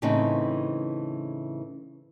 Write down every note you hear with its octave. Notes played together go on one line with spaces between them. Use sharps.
A2 C#3 E3 C4 D#4